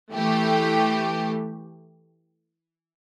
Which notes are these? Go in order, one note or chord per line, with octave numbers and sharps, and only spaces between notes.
E3 A3 G4